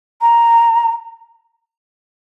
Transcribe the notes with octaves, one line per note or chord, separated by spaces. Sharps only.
A#5